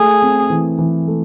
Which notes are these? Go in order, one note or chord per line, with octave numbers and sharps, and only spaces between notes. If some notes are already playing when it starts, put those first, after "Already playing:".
Already playing: A3 G#4
C4
E3
E3
A3